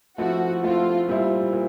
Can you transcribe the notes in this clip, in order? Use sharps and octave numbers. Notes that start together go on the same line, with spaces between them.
F3 A3 C4 E4 F#4
F3 A3 C4 E4 F4
A#2 G3 C4 E4
A#2